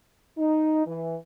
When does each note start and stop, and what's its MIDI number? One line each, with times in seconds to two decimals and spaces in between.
0.37 0.84 63
0.85 1.15 52